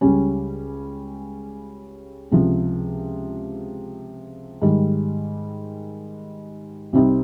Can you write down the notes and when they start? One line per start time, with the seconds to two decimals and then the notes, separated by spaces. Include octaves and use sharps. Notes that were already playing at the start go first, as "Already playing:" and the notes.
0.01 C#2 C#3 G3 C#4
2.31 C#2 C3 F3
4.62 G#2 D#3 G3
6.93 C2 C3 G3 C4 D#4